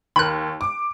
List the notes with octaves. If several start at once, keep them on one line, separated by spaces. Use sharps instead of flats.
D#2 A#4 B5 F#6
D6